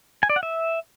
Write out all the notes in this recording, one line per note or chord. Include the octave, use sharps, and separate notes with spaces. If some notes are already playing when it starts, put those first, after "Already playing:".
G#5
D5
F#5
E5